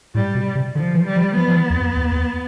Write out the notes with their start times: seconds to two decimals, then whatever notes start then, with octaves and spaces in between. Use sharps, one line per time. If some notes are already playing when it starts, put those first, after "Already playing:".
0.15 A2 G3
0.35 B2
0.55 C3
0.75 D3 F3
0.95 E3
1.06 G3
1.16 F3
1.36 F3 B3
1.48 F3
1.56 E3
1.70 E2
1.77 F2
1.97 E2
2.12 E2